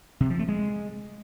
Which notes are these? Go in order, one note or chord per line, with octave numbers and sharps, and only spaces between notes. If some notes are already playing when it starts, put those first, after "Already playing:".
C3
F3
A3
G#3